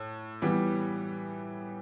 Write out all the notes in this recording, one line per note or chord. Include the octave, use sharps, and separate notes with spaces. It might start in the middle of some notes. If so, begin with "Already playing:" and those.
Already playing: A2
E3 G3 B3